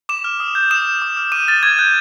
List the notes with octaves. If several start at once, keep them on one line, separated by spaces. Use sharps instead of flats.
D6 E7
F6
D#6
G6
D#6 E7
G6
D6
F6
D6 D#7
F6 A6
D6 G#6
F#6 G6